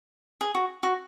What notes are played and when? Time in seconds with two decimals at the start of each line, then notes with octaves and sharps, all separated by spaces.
0.41 G#4
0.55 F#4
0.83 F#4